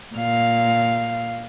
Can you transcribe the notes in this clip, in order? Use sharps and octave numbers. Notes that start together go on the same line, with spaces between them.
A#2 F5